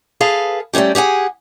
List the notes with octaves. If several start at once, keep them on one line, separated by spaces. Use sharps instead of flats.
G#4 A4 B4 F5
G3 A3 A#3 C#4 G4
G4 G#4 F#5 G#5